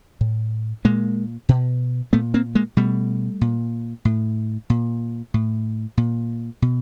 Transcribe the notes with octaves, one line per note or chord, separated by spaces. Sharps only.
A2
A#2 G#3 A#3
B2
A#2 A3 B3
A#3 C4
G#3 A#3
B2 G3 A3
A#2
A2
A#2
A2
A#2
B2